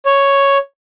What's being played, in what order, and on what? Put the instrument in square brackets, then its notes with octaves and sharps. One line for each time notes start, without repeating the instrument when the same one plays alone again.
[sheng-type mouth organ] C#5